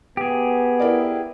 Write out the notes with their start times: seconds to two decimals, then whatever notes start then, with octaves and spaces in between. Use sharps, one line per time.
0.17 B3 G4 G#4
0.79 E4 A#4 D5